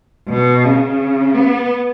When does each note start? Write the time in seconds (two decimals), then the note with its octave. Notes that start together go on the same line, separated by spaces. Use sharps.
0.29 B2
0.65 C#3
1.35 B3